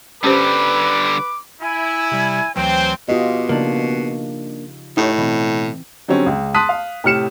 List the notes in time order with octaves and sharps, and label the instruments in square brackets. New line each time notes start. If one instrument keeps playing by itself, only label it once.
[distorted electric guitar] D3 G3 [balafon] C#4 G4 C5 [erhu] B4 [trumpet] D6
[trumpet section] E4 [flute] G#5
[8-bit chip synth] C3 G3
[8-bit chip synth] D2 E3 F#3 [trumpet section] C4 C5 [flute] G5
[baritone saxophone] B2 [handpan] F4 G4 D#5
[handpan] C#3 F3 D#4 [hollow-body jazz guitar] A#3 D4
[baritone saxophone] A2 [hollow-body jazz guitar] D#4 G4 C#5
[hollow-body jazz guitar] B2 [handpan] E3 C4
[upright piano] D3 F#3 G3 C4 C#4
C#2
A5 C6 D#6 F#6 B6 D#7
F5
A2 C3 F6 C#7 E7